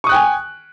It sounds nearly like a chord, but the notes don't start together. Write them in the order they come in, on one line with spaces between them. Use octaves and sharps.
C#6 D#6 F#6 G5 G#5